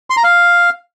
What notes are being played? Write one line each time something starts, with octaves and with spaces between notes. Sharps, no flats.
C6
A#5
F5